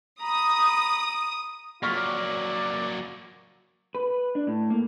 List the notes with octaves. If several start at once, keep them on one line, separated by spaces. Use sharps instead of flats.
A#5 B5 D#6
F#3 A#3 F4 C#6 F6 B6
D5
B4
D4
A2
A#3